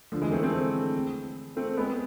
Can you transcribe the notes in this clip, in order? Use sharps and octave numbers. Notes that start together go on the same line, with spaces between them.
D3 F3
E3 G#3
A3 C4
A3 C4
A3 C4
G#3 B3